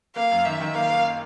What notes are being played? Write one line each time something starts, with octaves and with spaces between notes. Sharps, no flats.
A#3 F5
F#2
D#3 E5
D#3
A#3 F5
A#3